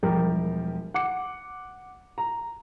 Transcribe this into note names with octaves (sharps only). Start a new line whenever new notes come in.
E1 F3 G3 G4 A#4
F#5 D6 C#7
A#5